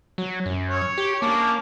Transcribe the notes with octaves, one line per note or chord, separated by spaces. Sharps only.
F#3
F#2
C#5
G4
A#3 C#4 A5 D6